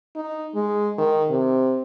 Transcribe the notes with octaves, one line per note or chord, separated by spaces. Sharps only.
D#4
G#3
D#3
C3